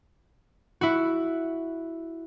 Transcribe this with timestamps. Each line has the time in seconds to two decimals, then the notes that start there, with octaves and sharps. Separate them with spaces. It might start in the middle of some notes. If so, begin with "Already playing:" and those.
0.81 E4 F#4